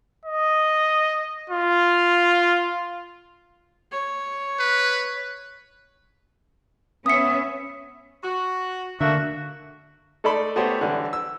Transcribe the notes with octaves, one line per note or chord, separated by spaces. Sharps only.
D#5
F4
C#5
B4
B3 C#4 E5 D#6 C#7
F#4
D3 A3 A#3 F#4 E5
A3 D#4 A4 D5 B5 C6
A3 B3 F#4 G4 C5 C#5
D3 E3 G3
E6